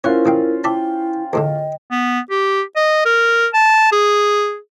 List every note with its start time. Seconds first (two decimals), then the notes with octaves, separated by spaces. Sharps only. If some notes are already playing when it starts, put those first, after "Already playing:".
0.04 C#4 E4 F4 A#4 C5 C#5 F#5
0.26 A1 F5 G5
0.64 E4 D5 E5 G5 A5
1.33 E2 A2 D3 D#5
1.91 B3
2.30 G4
2.76 D#5
3.05 A#4
3.54 A5
3.92 G#4